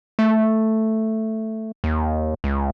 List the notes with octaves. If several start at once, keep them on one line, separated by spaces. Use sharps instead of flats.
A3
D#2
C#2